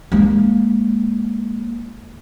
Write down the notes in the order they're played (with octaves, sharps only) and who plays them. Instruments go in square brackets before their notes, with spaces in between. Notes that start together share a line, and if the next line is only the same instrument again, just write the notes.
[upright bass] G#3 A#3